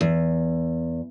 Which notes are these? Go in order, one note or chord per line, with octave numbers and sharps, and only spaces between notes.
E2